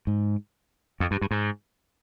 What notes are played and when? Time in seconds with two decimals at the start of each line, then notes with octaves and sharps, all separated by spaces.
0.07 G#2
1.00 F2
1.11 G2
1.22 G2
1.31 G#2